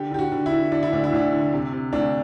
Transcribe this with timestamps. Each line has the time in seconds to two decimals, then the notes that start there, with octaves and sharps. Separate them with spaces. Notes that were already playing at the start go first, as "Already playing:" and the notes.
Already playing: D3 G4
0.11 D3 G4
0.19 F#4
0.32 D3
0.46 E4
0.52 D3
0.72 D3 D4
0.83 E4
0.92 D2 D4
1.04 E4
1.13 D2 D4
1.33 D3
1.53 C3
1.73 C3
1.93 D2 D4